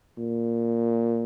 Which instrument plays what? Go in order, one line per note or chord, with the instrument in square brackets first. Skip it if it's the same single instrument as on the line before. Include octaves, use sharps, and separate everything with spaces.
[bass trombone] A#2